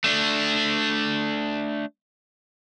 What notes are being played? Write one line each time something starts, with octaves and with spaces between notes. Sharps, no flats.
A3 D4